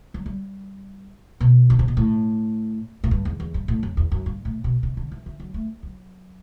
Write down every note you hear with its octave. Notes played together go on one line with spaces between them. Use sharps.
F#3
G3
B2
D3
C3
B2
A2
A2
G2
E2
E2
G2
A2
F#2
E2
F#2
G2
A2
B2
C3
D3
E3
E3
F#3
A3
F#3